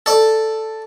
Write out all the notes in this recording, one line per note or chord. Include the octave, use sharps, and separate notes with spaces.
A4 D5